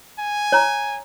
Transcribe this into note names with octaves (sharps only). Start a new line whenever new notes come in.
G#5
C#5 A#5